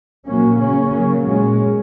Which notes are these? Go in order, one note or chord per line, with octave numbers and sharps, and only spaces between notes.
A#2 F#3 A#3 C#4
C#3 A#3 C#4
C#3 F#3 A#3
A#2 G#3 C#4